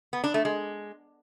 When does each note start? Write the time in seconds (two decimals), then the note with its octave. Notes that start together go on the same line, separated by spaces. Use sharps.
0.13 B3
0.24 D4
0.34 A3
0.45 G#3